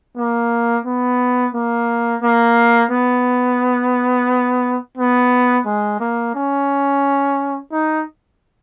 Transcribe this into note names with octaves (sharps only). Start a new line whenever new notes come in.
A#3
B3
A#3
A#3
B3
B3
G#3
A#3
C#4
D#4